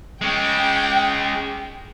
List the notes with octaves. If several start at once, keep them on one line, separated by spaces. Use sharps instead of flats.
G#3 C#4 G5